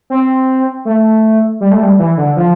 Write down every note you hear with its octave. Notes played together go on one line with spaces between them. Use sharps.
C4
A3
G3
A3
G3
E3
D3
F3